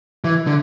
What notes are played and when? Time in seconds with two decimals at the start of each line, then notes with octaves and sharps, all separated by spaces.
0.24 E3
0.47 D3